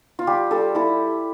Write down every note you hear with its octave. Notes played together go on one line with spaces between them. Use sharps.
F4
G3 G4
G3 A4
E4 A4